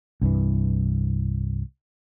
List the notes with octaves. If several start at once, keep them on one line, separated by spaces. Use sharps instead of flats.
C2 G2 E3